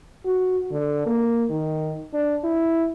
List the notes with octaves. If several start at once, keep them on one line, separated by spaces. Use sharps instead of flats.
F#4
D3
A#3
D#3
D4
E4